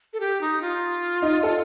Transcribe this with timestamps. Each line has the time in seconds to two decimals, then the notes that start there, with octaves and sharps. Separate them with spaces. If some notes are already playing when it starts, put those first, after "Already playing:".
0.13 A4
0.20 G4
0.41 D#4
0.62 F4
1.22 D#4
1.43 A4